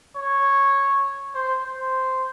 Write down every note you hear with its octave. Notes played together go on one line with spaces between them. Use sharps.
C#5
C5
C5